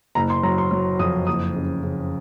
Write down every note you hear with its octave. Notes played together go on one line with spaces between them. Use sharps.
F#1 A#5
C6
F#3 A#5
C6
F#3
F2 D#6
F#1 D#6
C#3
C#3